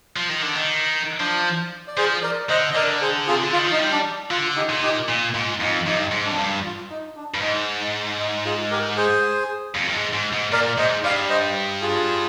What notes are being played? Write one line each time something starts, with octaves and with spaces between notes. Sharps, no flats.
F3
D#3
D3
D#3
F3 D4
D5
F3 G#4 C5
A#4 D5
D3 C5 D#5
D#5
D3 A#4 D5
G#4 C5
C3 F4 G#4
D3
D#3 F4
F3
D#4
G3
D4
D3 F4
D#4 G4
A#2
D#4 G4
A#2
G#2 F4
F2 D#4
G2 D#4
G#2
D4
F2
G2
F4
D#4
D4
G2
G#2 D#4
D#4
D#4
F4 G#4
G4 A#4
G#4 C5
F2
G2
G#2
G#2
G#2
A#2 A#4 D5
G#2 C5 D#5
G2 D5 F5
C5 D#5
F4 G#4